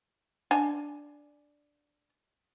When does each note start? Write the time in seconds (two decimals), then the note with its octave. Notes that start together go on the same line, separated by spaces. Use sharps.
0.51 D4 G#5